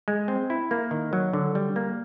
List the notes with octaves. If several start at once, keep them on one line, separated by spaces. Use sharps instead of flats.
G#3
C4
E4
A#3
D#3
F#3
D3
G3
A#3